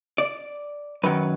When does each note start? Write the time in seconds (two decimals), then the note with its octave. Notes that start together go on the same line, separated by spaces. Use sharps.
0.18 D5
1.03 F#2 D#3 F#3 B4